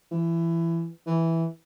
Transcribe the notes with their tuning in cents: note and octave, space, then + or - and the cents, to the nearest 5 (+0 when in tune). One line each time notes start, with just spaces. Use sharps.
E3 +20
E3 -5